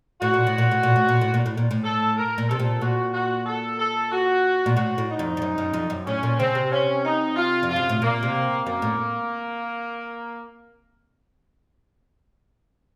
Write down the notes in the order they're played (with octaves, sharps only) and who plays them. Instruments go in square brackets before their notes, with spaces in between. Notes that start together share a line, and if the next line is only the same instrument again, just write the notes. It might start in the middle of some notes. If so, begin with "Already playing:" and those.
[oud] A2 [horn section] F#4
[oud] A#2
A2
A#2
A2
A#2
A2
A#2
A2
A#2
A2
A#2
A2
[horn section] A4
A#4
[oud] A#2
[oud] C3 [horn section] A4
[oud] A#2
[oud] A#2 [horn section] F#4
[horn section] F#4
A4
A4
F#4
[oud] A#2
[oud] A2 [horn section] F#4
[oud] A2
[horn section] D#4
[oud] F2
F2
F#2
F#2
F2
F#2
[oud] A2 [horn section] C#4
[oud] A#2
[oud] C#3 [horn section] C4
[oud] C3
[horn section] C#4
D#4
F4
[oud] F2
[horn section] F4
[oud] F#2
A2
[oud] A#2 [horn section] A#3
[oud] C3
[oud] F#2 [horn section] A#3
[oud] A2